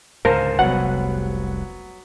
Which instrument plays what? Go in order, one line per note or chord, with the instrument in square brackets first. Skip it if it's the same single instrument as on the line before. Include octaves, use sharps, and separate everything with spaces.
[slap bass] C#2 G#2 D3 [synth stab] A#4 [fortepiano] C5 F5 A5
[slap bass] F1 C2 [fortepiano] F#3 B3 [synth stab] F#5